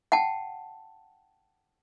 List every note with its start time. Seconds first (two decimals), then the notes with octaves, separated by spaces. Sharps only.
0.12 F#5 G5 A5